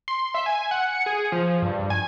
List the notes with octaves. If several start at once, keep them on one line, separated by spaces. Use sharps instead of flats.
C6
E5
G#5
F#5
C#7
G#4
F3
G2
G#5